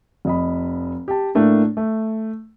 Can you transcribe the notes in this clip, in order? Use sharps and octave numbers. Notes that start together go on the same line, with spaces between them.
F1 D#5 B5
G4 A5
A2 A3 A#3 D4
A3